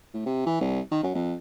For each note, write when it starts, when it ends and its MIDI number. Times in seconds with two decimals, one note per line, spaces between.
0.14 0.25 45
0.26 0.45 48
0.46 0.59 52
0.61 0.80 36
0.91 1.02 51
1.03 1.14 42
1.15 1.36 41